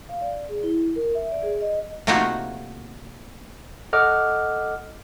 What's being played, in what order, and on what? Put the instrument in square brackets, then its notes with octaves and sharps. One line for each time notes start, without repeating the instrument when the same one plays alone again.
[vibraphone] F5
D5
G#4
E4
A#4
E5
D5
G#4
D#5
[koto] C3 A3 A#3 D#4 F4 F#4
[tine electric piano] A4 D#5 F#5 D6 F6